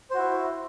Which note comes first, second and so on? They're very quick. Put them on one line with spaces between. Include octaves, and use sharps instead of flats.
C5 F#4 E4